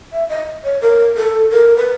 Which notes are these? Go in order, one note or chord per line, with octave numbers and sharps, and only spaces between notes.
E5
D#5
C#5
A#4
A4
A#4
B4